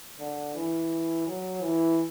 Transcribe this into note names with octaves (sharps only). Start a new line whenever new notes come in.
D3
E3
F#3
E3